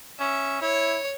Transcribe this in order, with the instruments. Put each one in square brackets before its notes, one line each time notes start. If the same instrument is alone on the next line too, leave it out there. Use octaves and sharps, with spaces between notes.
[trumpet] C#4 [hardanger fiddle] E5
[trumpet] E4 [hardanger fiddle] C#5